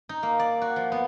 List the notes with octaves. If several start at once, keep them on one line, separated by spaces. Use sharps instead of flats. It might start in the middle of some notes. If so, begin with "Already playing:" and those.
D#4
A#3
D5
F#4
F3
B3